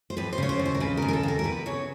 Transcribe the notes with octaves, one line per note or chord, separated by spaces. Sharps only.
C5
D#2 B4
C5
C#3 C#5
C5
D#2
C5
A#4
C#3 B4
A#4
D#2
A#4
A4
D#2 A#4
A#4
E2 B4
C#3 C#5